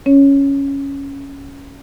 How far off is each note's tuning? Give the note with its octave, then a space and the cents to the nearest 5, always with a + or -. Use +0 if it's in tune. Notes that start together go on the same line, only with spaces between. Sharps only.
C#4 +0 C#5 +0